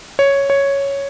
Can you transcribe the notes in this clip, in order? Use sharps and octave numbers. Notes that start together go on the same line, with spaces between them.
C#5
C#5